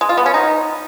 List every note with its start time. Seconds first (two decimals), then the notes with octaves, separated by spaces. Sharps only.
0.01 G#3
0.09 F4
0.17 B3
0.26 C#4
0.34 D#4